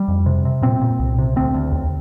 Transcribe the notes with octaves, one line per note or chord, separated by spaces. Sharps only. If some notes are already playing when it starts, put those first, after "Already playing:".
Already playing: G3
F2
C3
C3
A#2 C4
A#2
C2
C3
D2 C4
D2
D#2